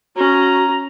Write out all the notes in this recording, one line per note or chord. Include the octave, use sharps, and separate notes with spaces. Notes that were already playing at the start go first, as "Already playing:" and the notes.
C#4 F#4 A#5